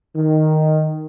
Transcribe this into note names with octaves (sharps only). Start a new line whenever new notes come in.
D#3